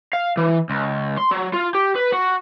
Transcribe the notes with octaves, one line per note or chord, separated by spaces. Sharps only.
F5
E3
C#2
C6
F#3
F4
G4
B4
F#4